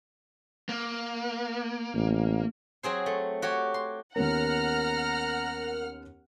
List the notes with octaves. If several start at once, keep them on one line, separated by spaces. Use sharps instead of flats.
A#3
A1
F#3 C4 G#4 C5
A3
F#4 G4 C#5
C6
D#2 B3 C#4 A#4 F#5 A#5 F6